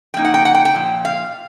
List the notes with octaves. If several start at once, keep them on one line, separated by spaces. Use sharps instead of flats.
F3 A#3 D#4 G5
F#5
G5
F#5
G5
G5
A#2 F3
F5